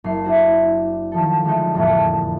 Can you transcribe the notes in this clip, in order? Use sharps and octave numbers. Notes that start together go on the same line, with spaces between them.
F#1 C7
D4 E4 F#4 C5
D#3 F3 A4
D3 G#3 A3 D#4
E1 F2 A2 A#3 A4